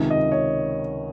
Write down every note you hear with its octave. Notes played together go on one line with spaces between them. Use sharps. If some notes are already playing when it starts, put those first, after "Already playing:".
Already playing: C#2 C3 D#3
D#5
C#5